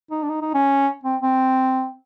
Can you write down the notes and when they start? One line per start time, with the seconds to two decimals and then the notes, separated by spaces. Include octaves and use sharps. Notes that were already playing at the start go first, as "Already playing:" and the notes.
0.11 D#4
0.23 D4
0.29 D#4
0.42 D#4
0.54 C#4
1.04 C4
1.22 C4